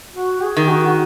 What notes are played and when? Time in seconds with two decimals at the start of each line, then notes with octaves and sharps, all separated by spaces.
0.16 F#4
0.43 G#4
0.57 D#3
0.70 F#4
0.86 F#4